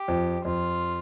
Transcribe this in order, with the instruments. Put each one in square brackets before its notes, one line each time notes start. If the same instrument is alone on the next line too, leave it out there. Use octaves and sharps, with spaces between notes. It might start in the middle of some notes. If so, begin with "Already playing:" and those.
Already playing: [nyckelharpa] G4
[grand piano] F2
[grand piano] F2 [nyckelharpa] F4